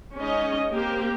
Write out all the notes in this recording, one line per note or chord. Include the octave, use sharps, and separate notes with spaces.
G#3 C#4 D#4 D#5
A#3 C4 G4 A#4